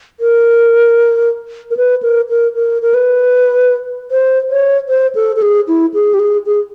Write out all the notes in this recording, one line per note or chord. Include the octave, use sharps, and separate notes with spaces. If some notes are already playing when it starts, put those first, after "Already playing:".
A#4
A#4
B4
A#4
A#4
A#4
A#4
B4
C5
C#5
C5
A4
A4
G#4
E4
G#4
G4
G#4
G#4